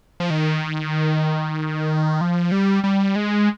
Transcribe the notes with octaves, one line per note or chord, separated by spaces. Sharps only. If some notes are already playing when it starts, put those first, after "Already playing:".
F3
D#3
F3
G3
G3
G#3